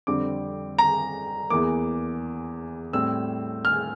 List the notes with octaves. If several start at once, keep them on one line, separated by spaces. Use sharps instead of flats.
F2 D3 G3 C4 D6
A#5
E2 E3 A#3 D6
A2 G3 C4 E6
F6